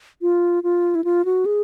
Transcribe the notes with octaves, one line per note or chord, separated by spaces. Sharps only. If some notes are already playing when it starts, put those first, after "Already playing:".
F4
F4
E4
F4
F#4
G#4